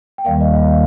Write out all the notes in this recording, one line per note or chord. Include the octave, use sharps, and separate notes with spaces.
G5
D#2 D#3 G3 A#3 F5
D#5
F5